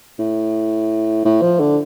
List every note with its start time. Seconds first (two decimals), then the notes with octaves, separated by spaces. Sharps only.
0.19 A2
1.25 A2
1.42 F3
1.60 D3